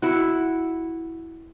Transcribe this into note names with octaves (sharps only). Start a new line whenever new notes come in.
E4 F#4